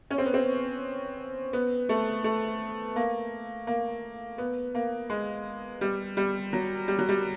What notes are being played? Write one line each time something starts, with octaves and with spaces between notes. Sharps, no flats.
C#4
C4
B3
C4
B3
A3
A3
A#3
A#3
B3
A#3
G#3
G3
G3
F#3
G3
F#3
G3